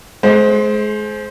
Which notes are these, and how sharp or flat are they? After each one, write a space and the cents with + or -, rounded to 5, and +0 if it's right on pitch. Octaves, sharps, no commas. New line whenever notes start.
G#3 +35 C5 +0